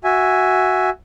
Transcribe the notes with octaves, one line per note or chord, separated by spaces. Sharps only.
F#4 E5 G#5